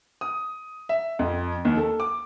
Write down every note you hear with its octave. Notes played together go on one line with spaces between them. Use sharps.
D#6
E5
F2
D#2
A4
D6